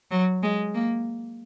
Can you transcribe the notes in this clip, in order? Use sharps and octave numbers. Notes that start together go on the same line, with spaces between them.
F#3
G#3
A#3